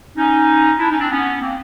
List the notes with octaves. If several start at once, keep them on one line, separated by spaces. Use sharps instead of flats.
C#4 D#4
D4 E4
C#4 D#4
C4 D4
B3 C#4
A#3 C4